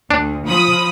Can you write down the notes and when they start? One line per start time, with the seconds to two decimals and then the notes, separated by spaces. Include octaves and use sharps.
0.11 D2 D4
0.46 F3 B5 D#6